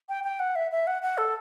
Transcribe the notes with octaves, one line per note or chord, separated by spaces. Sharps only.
G5
G5
F#5
E5
E5
F#5
F#5
A4